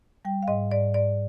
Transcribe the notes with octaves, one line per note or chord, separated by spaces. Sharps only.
G3 G5
F5
G#2 D#5
G#2 D5
G#2 D5